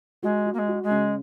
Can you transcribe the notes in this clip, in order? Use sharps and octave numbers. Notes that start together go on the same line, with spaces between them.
G#3 F#4
F#4
A#3
G#3
F#4
G#3
C#3